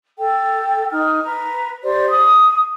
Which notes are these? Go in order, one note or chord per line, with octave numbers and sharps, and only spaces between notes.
A4 G5
D#4 F6
B4 A#5
G4 C5 D5
D#6